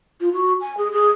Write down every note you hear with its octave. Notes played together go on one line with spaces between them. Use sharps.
F4
F#4
G#5
G#4
G#4